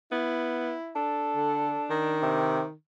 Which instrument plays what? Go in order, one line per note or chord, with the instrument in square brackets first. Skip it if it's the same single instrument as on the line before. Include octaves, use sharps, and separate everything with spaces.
[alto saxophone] B3 [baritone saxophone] E4
[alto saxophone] D4 [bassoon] A4
[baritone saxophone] D3
D#3
[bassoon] C3